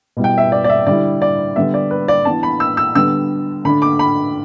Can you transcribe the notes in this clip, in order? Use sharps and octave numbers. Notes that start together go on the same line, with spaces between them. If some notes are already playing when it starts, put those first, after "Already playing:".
B2 G3 B3 E4
G5
E5
D5
D5
E5
D3 G3 E4 D5
D5
D3 G3 B3 E5
D5
B4
D5
E3 B3 D4 A5
B5
E6
E6
D3 G3 B3 D4 E6
D3 A3 D4 B5
D6
B5